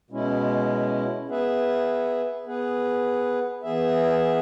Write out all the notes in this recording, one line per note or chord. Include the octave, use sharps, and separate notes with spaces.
B2 G#3 C#4 E4
B3 G#4 B4 E5
B3 G#4 B4
E3 B3 G#4 E5